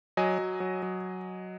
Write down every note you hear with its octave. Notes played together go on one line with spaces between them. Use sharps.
F#3 D#5 G#5
F#3
F#3
F#3